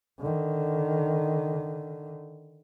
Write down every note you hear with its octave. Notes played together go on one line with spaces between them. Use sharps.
D3 D#3